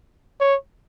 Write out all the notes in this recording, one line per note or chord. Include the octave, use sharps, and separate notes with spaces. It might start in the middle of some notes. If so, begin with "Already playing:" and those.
C#5